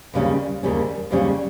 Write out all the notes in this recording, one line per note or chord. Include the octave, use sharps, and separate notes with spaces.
D#2 C#3 G3 C#4
D#2 C#3 G3 C#4
D#2 C#3 G3 C#4